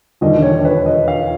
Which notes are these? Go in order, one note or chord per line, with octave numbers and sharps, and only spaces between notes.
E1 D#2 D3 G3 D#5
C#5
B4
D#5
F5